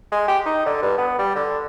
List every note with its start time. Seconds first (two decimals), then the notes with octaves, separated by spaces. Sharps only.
0.12 G#3
0.28 G4
0.46 D#4
0.66 D3
0.82 G2
0.98 B3
1.19 G3
1.35 D3